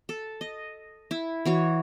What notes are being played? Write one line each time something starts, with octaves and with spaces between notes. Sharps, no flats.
A4
D#5
E4
E3 F#4 C#5